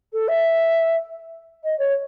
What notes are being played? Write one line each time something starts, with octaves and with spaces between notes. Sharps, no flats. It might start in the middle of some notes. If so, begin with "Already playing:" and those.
A4
E5
D#5
C#5